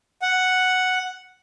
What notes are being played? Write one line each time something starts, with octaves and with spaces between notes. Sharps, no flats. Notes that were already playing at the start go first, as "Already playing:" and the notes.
F#5